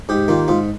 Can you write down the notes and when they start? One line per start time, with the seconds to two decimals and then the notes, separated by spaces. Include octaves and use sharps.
0.09 G#2 G4
0.28 D#3 A#3 F4
0.48 G#2 F4